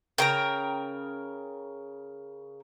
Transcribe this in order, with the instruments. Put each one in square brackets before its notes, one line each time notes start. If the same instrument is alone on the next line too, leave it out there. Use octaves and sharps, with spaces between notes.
[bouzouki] C#3 A#5 [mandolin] A#4 G5